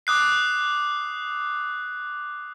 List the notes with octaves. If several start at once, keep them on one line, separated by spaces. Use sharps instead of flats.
D6 D#6 F#6 C7